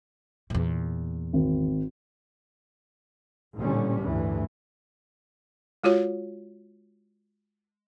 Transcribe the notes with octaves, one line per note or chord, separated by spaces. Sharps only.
E2 A#2
G#1
A1 D2 A#2 D3 G3 C#4
D2 G2 E3
G#3 F4 F#4 C#5